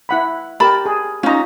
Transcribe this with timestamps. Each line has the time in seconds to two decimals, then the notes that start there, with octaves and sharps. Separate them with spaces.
0.09 E4 F#5 B5
0.60 G4 A#4 A5 B5
0.86 G#4
1.23 C#4 D#4 F4 A#5